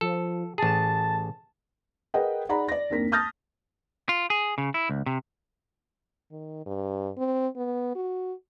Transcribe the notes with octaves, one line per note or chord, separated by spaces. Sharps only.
F3 A4
A1 G#4 A5
G#4 A#4 B4 D#5 F#5 G5
D#4 G#4 D5 F#5 A#5 B5
D5 A#6
F#1 D#2 C4 D4 A#4 B6
A5 D#6 F6 G6 A6 A#6
F4
G#4
C#3
E4
C#2
C3
D#3
G2
C4
B3
F#4